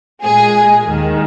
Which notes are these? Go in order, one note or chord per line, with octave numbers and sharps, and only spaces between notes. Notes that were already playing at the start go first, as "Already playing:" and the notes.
A#2 G#3 G#4
D#2 D#3 G#3